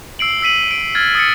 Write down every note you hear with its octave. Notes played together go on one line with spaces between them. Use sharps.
E6 C7 D7 F#7
E6 B6 D#7 F#7
D7
F6 G#6 A6
D#6 A6 C#7